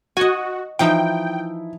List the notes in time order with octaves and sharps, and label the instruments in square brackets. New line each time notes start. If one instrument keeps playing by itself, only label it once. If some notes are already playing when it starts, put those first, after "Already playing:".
[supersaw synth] F#4 [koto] D#5 G#5
[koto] E3 F3 D#4 [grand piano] E4 [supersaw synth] G5